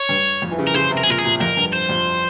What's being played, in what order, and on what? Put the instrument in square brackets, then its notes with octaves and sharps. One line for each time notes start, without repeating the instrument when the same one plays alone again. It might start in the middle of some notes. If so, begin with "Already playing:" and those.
Already playing: [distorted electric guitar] C#5
[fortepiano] G2
F2
E3
C#3
[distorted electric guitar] A#4
[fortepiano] C#3 [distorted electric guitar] C5
[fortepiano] C3
[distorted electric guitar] A#4
G#4
[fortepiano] A#2 [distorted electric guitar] A#4
[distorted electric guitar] G#4
[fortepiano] A#2
[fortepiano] F2 [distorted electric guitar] A#4
[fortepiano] G2
[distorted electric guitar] C5
[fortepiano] F2